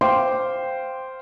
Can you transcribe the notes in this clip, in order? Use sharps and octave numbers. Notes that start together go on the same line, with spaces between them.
C5 F5 G5 C6 D6